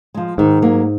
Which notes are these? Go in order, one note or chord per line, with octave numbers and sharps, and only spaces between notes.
F3 G#3
G#2 D#3
F#3 A#3